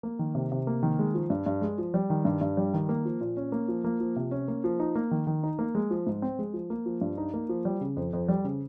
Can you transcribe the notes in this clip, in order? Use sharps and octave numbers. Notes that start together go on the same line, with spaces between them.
A#3
D#3
C3
C3
A#3
D#3
G#3
F3
G2
G2
G#3
F3
G3
D#3
G2
G2
G3
D#3
A#3
F3
A#2
C#4
A#3
F3
A#3
F3
C3
C#4
A#3
F3
D#4
A#3
D#3
D#3
D#4
A#3
G#3
F3
G#2
C4
G#3
F3
A#3
F3
G2
D#4
A#3
F3
G3
C#3
F2
F2
G3
C#3